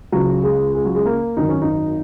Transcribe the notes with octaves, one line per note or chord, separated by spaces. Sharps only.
C#2 C#3 F#3
G#3
G#3
F#3
G#3
A#3
G#1 F#2 D#3 D#4
C#4
D#4